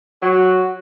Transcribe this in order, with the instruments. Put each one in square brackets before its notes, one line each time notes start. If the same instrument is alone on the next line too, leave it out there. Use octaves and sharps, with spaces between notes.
[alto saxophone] F#3 [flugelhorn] F#4